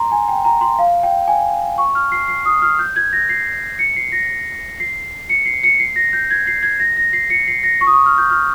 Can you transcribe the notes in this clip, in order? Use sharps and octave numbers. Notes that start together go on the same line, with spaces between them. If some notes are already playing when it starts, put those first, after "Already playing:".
Already playing: A#5 C6
G#5
G5
A#5
C6
F5
G5
G#5
C#6
F6
C7
C7
D#6
F6
G6
G#6
A#6
C7
C#7
C7
A#6
C7
C#7
C7
C#7
C7
A#6
G6
G#6
C7
G#6
A#6
A#6
C7
C#7
C7
A#6
C#6
D#6
C#6
F6
G6
F6